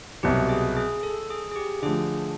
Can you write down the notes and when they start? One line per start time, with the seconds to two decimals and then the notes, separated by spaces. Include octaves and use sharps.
0.23 C2 B2 F#3 G4
0.49 G#4
0.77 G#4
1.03 A4
1.30 G#4
1.52 G#4
1.56 G4
1.82 D3 F3 A3 G#4